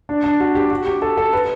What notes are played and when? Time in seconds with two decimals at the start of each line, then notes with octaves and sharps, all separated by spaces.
0.09 D4
0.24 D4
0.40 F#4
0.55 G4
0.71 F#4
0.86 G4
1.02 A4
1.17 A4
1.33 B4